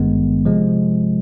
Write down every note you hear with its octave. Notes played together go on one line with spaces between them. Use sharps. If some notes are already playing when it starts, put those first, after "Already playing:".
Already playing: G#1 G2 D#3 G#3 B3
C3 F3 G#3